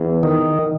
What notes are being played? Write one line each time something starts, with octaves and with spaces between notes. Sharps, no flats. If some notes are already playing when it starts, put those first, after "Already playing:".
Already playing: E2
D#3